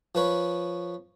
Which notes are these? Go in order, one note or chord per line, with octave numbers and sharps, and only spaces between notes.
F3 B4 C#5